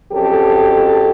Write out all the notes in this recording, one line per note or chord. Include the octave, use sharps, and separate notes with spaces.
F2 C#3 F#3 G4 A4